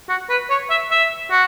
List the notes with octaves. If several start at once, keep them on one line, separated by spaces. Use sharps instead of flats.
F#4
B4
C#5
E5
E5
F#4